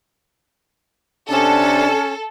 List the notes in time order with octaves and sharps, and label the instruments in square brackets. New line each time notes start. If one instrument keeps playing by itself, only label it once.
[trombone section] C3 D4 [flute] C#4 [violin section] A4